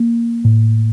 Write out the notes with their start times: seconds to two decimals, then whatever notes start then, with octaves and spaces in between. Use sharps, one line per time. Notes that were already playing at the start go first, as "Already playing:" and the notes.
Already playing: A#3
0.45 A2